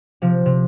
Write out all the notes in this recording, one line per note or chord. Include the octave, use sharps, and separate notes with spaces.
C3 F3
C3